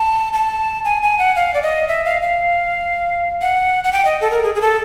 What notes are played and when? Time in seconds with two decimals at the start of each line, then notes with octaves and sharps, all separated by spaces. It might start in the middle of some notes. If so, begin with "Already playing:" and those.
Already playing: A5
0.33 A5
0.85 G#5
1.03 G#5
1.19 F#5
1.36 F5
1.54 D5
1.62 D#5
1.88 E5
2.05 F5
2.22 F5
3.41 F#5
3.84 F#5
3.93 G5
4.05 D#5
4.21 A4
4.31 A#4
4.44 G#4
4.55 G#4
4.62 A4